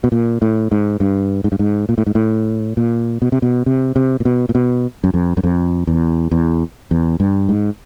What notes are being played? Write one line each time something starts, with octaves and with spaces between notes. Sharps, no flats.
B2
A#2
A2
G#2
G2
G#2
G2
G#2
A#2
A2
G#2
A2
A#2
B2
C3
B2
C3
C3
A#2
B2
A#2
B2
F#2
F2
F#2
F2
E2
E2
E2
G2
G#2